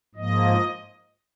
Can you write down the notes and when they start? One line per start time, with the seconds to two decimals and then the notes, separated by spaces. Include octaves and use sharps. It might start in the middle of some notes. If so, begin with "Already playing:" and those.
0.15 G#2 F3 A#3 D#5